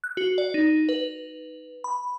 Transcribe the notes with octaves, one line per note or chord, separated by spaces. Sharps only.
F#6
F#4
D5
D#4
B4
B5